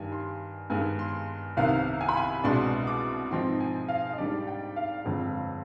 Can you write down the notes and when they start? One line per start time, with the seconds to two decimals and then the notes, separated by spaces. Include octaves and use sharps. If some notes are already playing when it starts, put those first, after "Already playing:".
Already playing: G2 D#3 G3 G#5
0.12 C6
0.70 G2 D#3 G#3 B3 G#5
0.99 C6
1.57 C2 C3 D#3 B3 F5
2.01 G#5
2.09 B5
2.17 G#5
2.44 C2 B2 G#3 D4 C6
2.87 D6
3.31 G#2 F3 C4 D#4 C6
3.60 G#5
3.89 F5
4.13 D#5
4.18 G#2 G3 D4 D5
4.47 G5
4.76 F5
5.05 G1 F2 D3 G#3